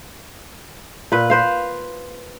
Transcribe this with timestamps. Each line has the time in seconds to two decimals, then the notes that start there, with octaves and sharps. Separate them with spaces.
1.12 A#2 B4
1.30 B4 C5 F5